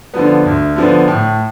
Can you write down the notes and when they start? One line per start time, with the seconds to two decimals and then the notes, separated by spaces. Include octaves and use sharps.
0.14 D3 F3 B3
0.45 D2
0.76 D3 F3 B3
1.08 A2